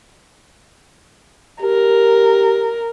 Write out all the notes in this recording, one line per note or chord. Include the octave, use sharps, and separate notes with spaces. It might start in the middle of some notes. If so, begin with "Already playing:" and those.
G4 A#4